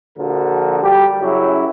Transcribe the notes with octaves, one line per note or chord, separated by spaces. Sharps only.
A#1 D3 F3 F#4 A#4
G3 G4
F#2 C#3 F#3 E4 F#4